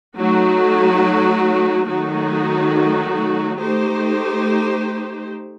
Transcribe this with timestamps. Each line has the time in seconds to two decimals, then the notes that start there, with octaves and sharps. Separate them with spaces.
0.17 F#3 A3 D#4 F#4
1.87 D#3 F#3 A3 D#4 F#4
3.58 A3 D#4 G4 C5